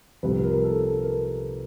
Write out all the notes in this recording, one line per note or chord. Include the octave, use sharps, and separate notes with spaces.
C2 C3 F3 B4
A#4
A4
A4
A#4